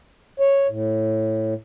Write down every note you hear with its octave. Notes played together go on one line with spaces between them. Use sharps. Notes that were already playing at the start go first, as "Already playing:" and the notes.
C#5
A2